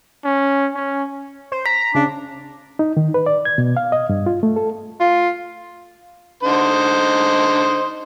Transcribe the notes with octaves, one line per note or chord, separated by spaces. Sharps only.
C#4
C#4
C5
A#5 B6
C#3 D4
D#4
D#3
B4
D5
G#6
B2
F5
D#5
G2
F4
A3
A4
F4
D3 D#4 C5